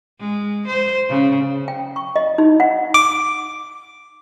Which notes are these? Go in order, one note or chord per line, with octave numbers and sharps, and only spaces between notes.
G#3
C5
C#3
G5
C#6
D#5
D#4
F#5
D6